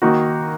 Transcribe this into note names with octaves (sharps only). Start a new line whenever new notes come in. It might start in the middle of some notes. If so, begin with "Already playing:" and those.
D#3 A#3 D#4 F#4